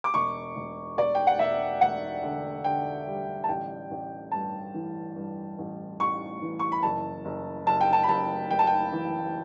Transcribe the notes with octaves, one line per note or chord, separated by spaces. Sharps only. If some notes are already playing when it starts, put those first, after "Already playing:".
D6
E1 C#6
E1
E1 D5
G5
F#5
E1 E5
E1 F#5
D3
D3 G5
G3
A5
A1 G5
A1
G2 A5
E3
G2
A1
A1 C#6
E3
C#6
B5
F#1 A5
F#1
F#1 A5
G5
A5
B5
F#1 A5
F#1 G5
A5
G5
E3